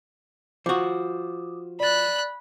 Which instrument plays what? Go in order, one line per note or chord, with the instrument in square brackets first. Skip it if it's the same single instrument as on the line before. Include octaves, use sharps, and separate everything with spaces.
[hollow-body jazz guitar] F3 F#4 [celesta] D6 D#6
[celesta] D5 A6 [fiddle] B5 F#6